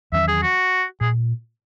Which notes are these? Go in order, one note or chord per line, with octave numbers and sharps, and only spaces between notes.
E2 D#3 F#3 C#4 E5
G#4
F#4
A#2 G#4